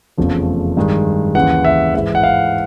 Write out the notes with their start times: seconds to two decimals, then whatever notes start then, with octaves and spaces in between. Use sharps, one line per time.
0.17 F1 E2 C#3 F3 A3
0.77 G2 D#3 G#3
1.35 D#2 C#3 E3 F#5
1.65 E5
1.94 G#2 E3 G#3 E5
2.15 F#5
2.23 F5